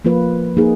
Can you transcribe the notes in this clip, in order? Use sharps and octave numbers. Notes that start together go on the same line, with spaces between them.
F3 A#3 F4 B4
A#3 D#4 G#4